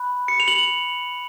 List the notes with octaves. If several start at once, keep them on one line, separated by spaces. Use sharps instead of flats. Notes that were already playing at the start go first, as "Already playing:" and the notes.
Already playing: B5 F#6
C#7
F7
F#7